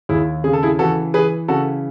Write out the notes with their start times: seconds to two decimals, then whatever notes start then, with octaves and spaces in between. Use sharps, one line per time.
0.09 D#2 E4 G#4
0.44 C#3 G#4
0.53 A4
0.63 E4 G#4
0.79 E3 F#4 A4
1.14 E3 G#4 B4
1.48 C#3 F#4 A4